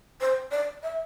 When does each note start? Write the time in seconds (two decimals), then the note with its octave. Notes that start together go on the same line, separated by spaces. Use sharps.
0.21 C5
0.51 D5
0.83 E5